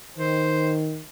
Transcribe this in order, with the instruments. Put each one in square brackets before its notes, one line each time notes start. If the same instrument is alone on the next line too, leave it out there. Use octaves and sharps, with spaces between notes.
[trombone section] D#3 [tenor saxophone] C5